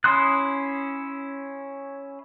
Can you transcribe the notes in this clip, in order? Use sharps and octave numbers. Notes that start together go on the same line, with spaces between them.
C#4 E4 C6 D#6 F#6